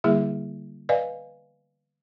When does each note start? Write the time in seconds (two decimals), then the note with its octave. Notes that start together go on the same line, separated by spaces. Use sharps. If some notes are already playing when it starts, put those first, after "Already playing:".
0.04 D3 G3 A#3 E4 G#4 E5
0.89 B4 D5 D#5 F5 G#5